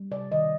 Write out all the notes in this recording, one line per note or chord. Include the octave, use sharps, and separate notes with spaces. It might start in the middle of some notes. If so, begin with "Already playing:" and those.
Already playing: G3
C3 D5
D#3 D#5